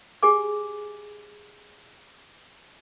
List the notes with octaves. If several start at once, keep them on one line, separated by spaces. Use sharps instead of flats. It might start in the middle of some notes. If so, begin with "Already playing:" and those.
G4 G#4 G#5 D6